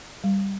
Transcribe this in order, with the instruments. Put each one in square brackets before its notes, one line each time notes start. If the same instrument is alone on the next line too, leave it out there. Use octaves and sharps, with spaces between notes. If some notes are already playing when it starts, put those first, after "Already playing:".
[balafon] G3